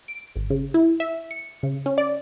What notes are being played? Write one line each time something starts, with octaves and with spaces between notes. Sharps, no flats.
D7
G#1
C#3
E4
E5
C#7
C#3
C#4
D5